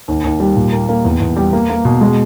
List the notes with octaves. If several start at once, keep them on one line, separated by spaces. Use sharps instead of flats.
D#2
D#2
G3
A#2
A#3
A#3
E2
E2
G3
A#3
A#3
B2
G#3